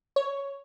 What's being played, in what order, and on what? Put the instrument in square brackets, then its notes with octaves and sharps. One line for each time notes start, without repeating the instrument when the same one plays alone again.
[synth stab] C#5